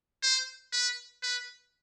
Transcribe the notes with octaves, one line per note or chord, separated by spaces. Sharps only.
C5
B4
B4